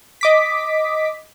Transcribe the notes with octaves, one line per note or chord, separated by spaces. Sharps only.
D#5 D6 B6